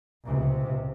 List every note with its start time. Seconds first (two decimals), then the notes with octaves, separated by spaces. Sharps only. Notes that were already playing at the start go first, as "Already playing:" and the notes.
0.24 C#2 C3